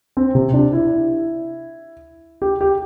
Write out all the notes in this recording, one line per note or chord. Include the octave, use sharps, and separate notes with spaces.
C4
C3
D4
E4
G4
G4